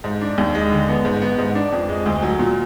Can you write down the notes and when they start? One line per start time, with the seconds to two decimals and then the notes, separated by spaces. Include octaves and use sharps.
0.04 G#2
0.21 D4
0.38 D#2
0.55 G#3
0.72 D3
0.89 B3
1.05 G#2
1.22 B3
1.39 G#2
1.55 D4
1.72 F2
1.89 G#3
2.06 D2
2.23 F#3
2.39 A#2